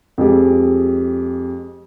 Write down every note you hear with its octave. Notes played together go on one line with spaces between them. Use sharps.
F2 G#3 G4